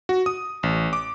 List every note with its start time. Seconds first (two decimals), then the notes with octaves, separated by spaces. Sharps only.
0.09 F#4
0.26 D#6
0.63 A1
0.93 D6